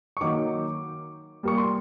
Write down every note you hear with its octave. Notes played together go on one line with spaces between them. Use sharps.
C#6
D#3 F#3 A#3 D6
A#2 G3 A#3 C#6
C6